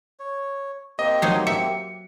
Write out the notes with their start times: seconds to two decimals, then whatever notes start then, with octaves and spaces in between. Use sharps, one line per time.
0.19 C#5
0.99 A#3 C4 G4 D#5
1.22 F#3 D#4 C5
1.47 E5 C#7